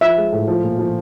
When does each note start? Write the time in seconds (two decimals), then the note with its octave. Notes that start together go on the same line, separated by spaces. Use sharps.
0.01 F3 E5
0.17 G#3
0.32 A2
0.47 F3
0.64 A#2
0.79 F3